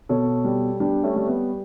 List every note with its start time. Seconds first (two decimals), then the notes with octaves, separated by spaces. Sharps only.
0.09 B2 A4 C#5
0.45 G3
0.80 G3 B3 D4
1.04 A3 C#4
1.16 G3
1.28 B3